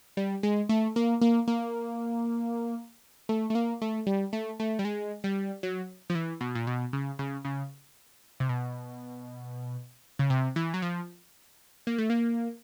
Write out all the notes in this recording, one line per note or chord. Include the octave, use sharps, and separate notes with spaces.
G3
G#3
A3
A#3
A#3
A#3
A3
A3
A#3
A3
G3
A3
A3
G3
G#3
G3
F#3
F3
E3
B2
A#2
B2
C#3
C#3
C#3
C3
B2
C#3
C3
E3
F#3
F3
A#3
A3
A#3